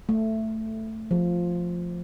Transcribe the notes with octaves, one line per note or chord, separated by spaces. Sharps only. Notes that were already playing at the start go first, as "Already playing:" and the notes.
A3
F3